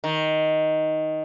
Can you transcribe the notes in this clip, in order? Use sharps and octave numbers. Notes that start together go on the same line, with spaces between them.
D#3